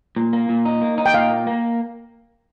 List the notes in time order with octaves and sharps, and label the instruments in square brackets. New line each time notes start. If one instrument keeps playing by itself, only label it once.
[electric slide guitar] A#2
A#3
A#2
D#4
A#3
D#4
[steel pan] G5
[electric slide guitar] A#2 [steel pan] F5
[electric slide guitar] A#3
A#3